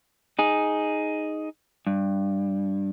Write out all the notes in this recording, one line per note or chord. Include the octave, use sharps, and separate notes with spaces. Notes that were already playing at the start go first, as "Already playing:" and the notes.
D#4 G#4
G2